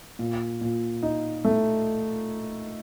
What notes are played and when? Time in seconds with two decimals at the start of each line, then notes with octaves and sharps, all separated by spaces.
0.19 A#2
0.61 A#2
1.03 D#4
1.45 A3